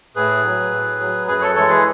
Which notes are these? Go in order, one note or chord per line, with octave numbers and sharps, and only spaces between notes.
A2 G#4 B4
F#3
A2
F#3
F#2 G#4 B4
A4 C#5
E3 G#3 A4 C#5
G#4 B4